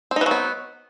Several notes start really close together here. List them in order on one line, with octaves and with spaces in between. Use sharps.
C4 D#4 E3 F#3 B3